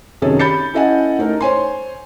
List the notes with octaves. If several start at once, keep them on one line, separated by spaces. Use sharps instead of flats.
F#2 C3 D#3 G#4 A4 C#5
B5 G6 A6 C#7
C#4 E4 A4 D#5 F#5 G#5
A3 D#4 A#4
C5 C#5 G#5 C6